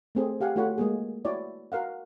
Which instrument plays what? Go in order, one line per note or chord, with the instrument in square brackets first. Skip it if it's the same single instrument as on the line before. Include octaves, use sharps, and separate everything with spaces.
[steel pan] A3 C4 G#4
G4 F5 F#5 G#5
A3 F4 F#4 C#5 F#5 B5
G#3 A#3 G#4
E4 F#4 C#5 D5
F#4 A#4 F5 F#5